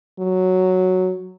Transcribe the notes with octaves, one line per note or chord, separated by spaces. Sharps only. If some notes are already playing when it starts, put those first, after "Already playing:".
F#3